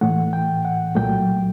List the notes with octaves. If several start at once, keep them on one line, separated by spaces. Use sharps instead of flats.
A2 E3 A3 F#5
G5
F#5
C2 A#2 F#3 A3 G5